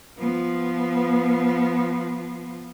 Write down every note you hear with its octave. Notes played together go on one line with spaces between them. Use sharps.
F3 B3